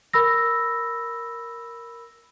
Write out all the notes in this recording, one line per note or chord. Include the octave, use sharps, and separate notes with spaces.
A#4 B5 E6 A#6